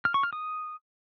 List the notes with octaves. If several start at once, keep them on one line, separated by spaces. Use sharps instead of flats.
F6
C#6
F6
D#6